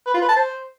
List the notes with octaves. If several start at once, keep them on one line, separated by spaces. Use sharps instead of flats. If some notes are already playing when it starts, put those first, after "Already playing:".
B4
F4
B4
A5
C5